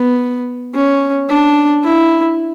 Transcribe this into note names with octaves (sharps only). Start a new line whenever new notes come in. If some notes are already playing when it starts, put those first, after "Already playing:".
Already playing: B3
C#4
D4
E4